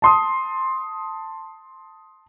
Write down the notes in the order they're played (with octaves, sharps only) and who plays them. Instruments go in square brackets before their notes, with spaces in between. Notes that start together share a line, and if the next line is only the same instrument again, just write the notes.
[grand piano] A5 C6 D#6